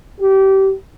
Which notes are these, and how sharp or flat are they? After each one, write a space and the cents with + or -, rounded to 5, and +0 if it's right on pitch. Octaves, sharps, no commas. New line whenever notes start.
G4 -25